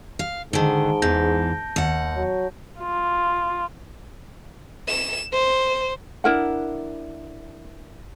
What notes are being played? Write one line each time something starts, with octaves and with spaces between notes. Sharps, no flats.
F5
G#2 D3 D#3 A5 D7 G7
E2 E3 G6 A#6
D#2 F#5
F#3
F4
E7
C5
D4 E4 A#4 F#5